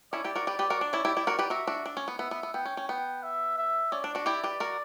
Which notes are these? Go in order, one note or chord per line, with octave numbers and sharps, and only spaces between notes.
C#4 E4 D5
E4 G4
F#4 A#4
G4 B4
G4 B4
F#4 A#4
D4
C#4 E4
E4 G4
E4 G4
F#4 A#4
G4 B4
F#4 A#4 E5
D4 F#4
D4
C#4
B3
B3 E5
B3
B3
B3 G5
C#4
C#4
B3 G5
E5
E5
C#4 D5
D4
D4 F#4
E4 G4 D5
G4 B4
F#4 A#4